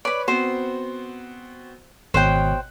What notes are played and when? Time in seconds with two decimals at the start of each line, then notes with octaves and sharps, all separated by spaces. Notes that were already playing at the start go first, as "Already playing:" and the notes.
0.05 B4 C#5 D5 B5
0.28 B3 C4 F#4 C5
2.14 G#1 B2 C5 C#5 G5 F#6